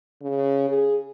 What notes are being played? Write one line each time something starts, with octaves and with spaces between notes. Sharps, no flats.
C#3
G#4